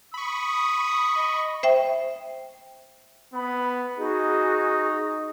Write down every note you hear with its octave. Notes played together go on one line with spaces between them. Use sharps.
B5 C#6 D#6
D#5
C5 E5 G5
B3 B5
D#4 F#4 G#4